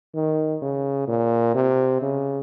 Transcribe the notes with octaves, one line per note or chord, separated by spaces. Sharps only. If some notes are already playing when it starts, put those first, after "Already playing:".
D#3
C#3
A#2
C3
C#3